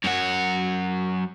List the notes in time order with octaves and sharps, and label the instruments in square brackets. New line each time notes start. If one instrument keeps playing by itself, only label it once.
[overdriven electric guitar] F#2 F#4